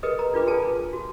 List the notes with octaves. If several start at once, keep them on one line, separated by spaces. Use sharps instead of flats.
G#4 A#4 B4 D#5 D#6
A#5
D4 F4 B4 D6
G#4 A4 B4 G#5 A5
F#4